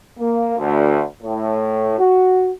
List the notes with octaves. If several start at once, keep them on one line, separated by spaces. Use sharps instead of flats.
A#3
D2
A2
F#4